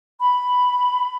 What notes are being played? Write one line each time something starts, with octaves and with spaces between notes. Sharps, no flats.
B5